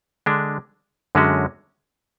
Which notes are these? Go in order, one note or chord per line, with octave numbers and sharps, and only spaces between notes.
D3 G#3 D4
F#2 D3 G#3 C#4 F#4